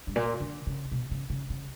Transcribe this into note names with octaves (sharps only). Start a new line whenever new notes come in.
G2
A#2
D3
C#3
B2
C#3
C#3
C#3